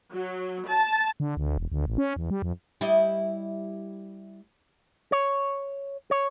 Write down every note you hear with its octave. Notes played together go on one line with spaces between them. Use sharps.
F#3
A5
D3
D2
E1
D2
A1
C#4
E2
G3
F2
G3 E4 D#5
C#5
C#5